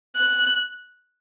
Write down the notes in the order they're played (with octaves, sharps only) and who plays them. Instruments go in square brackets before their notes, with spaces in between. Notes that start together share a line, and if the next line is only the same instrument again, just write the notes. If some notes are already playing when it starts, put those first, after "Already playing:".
[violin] F#6